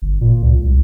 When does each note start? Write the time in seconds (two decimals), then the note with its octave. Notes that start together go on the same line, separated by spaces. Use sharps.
0.02 G1
0.21 A#2
0.43 C#2
0.65 C2